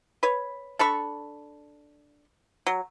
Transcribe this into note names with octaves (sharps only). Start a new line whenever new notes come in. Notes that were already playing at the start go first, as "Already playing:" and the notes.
B4 C#5
D4 A4 B5 C#6
F#3